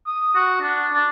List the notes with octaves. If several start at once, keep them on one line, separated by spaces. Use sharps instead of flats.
D#6
F#4
D4
D4